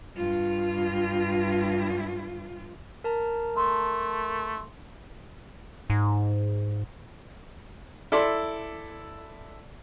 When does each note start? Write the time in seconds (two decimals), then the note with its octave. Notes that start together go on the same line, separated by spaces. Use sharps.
0.16 G2 F4
3.04 A#4 A5 A#5
3.57 A3 C6
5.90 G#2
8.12 E4 A4 D5 C6